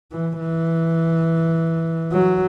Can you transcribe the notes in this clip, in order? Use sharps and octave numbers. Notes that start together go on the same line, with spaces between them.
E3
E3
F#3